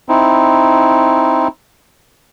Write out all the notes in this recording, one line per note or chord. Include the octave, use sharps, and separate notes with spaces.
C4 D#4 E4